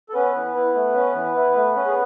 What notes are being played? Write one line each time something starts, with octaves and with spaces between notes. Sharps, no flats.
A4
B3 C#4 B4
E3
E4
A3
C#4
E3
E4
A3
C#4
G#4